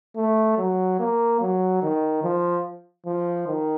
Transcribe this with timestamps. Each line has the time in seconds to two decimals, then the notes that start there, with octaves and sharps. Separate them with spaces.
0.16 A3
0.58 F#3
1.00 A#3
1.41 F#3
1.83 D#3
2.24 F3
3.06 F3
3.48 D#3